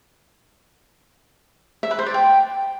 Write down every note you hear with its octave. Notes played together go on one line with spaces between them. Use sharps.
E5
B4
C5
D5
G5